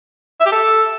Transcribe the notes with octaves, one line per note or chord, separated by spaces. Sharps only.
E5
G4
A4